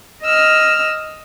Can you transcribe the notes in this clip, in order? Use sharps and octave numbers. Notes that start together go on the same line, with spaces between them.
D#5 E6 F6